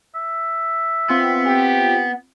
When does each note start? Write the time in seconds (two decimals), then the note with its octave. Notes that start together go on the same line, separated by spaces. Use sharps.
0.15 E5
1.09 B3 C4 F4
1.46 G4